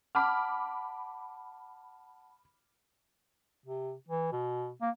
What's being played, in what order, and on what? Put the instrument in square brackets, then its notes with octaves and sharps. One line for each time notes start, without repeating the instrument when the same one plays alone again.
[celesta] F#5 A5 [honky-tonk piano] B5 D6 F6
[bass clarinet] C3
E3
B2
A#3